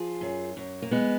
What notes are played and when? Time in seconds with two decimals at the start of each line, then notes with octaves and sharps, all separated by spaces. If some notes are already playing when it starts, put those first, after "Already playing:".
Already playing: F3 F4 G#4
0.21 F#2
0.57 F#2
0.82 A#3
0.91 F2 G#3 B3